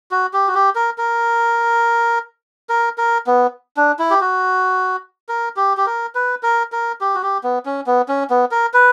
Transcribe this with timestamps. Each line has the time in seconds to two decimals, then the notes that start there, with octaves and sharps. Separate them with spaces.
0.11 F#4
0.33 G4
0.48 F#4
0.55 G4
0.75 A#4
0.98 A#4
2.69 A#4
2.98 A#4
3.27 B3
3.77 D4
3.99 E4
4.10 G4
4.21 F#4
5.29 A#4
5.56 G4
5.77 G4
5.86 A#4
6.15 B4
6.43 A#4
6.72 A#4
7.01 G4
7.15 F#4
7.23 G4
7.44 B3
7.66 C#4
7.87 B3
8.09 C#4
8.30 B3
8.51 A#4
8.74 B4